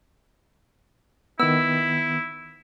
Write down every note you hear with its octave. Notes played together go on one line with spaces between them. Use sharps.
D#3 B3 E4 E6